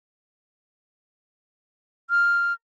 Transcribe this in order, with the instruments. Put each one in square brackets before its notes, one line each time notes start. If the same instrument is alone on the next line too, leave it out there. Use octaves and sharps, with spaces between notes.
[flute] F6